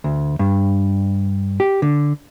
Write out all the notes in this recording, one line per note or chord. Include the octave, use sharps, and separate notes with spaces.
D2
G2
G4
D3